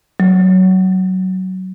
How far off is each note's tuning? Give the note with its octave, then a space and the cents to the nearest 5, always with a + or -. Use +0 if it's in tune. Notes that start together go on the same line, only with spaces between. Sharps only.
F#3 +15